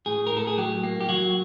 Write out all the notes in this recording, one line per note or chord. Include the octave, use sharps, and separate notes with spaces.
A2 G#4
A#4
A2 A4
G#4
F#3 G4
A#3
G4
F#3 F#4